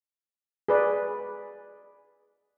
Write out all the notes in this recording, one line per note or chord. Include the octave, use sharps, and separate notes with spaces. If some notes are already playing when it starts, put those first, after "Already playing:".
G#4 B4 D5